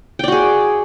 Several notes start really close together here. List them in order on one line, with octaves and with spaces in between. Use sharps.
G5 D5 F#4 G#4